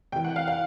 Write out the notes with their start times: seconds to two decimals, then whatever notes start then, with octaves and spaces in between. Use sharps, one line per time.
0.12 C3 E3 G5
0.24 F#5
0.36 F5
0.48 F5